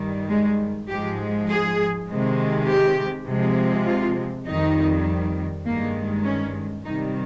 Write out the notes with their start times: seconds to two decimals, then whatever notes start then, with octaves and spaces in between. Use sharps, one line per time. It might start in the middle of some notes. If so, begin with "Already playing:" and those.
Already playing: G2 D#3 G3
0.29 G#3
0.88 G#2 F3 G#3 G4
1.49 G#4
2.08 C3 D#3 G#3
2.67 G4
3.27 C3 F3 G#3
3.86 F4
4.46 F2 D#3 G3 D#4
5.65 G2 D#3 G#3 A#3
6.25 C#4
6.84 C3 D#3 G3 D#4